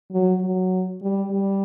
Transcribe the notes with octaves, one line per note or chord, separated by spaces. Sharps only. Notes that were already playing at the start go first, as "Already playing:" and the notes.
F#3
F#3
G3
G3